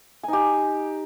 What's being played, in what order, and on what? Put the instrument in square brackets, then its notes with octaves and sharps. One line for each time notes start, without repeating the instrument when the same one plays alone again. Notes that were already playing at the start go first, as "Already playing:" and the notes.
[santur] G#5
D#4
G4